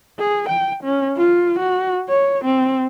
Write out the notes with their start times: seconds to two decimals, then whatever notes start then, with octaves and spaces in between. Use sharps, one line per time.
0.19 G#4
0.49 G5
0.84 C#4
1.17 F4
1.59 F#4
2.09 C#5
2.45 C4